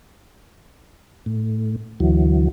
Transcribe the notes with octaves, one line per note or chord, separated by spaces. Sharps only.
A2
D2 E3 F#3